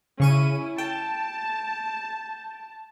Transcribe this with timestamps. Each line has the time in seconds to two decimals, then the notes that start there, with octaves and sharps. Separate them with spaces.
0.20 C#3 C#4 E4 C#6 D#7
0.78 G5 A5